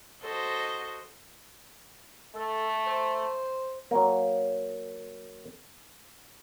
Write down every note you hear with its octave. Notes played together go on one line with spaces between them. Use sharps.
F#4 A4 C5 D#5
A3 A4
C5
F#3 A#3